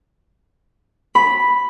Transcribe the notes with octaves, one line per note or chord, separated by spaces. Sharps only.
B5